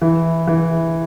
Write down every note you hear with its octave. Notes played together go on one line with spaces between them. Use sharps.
E3
E3